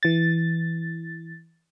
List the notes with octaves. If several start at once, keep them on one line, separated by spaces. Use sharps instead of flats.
E3 A6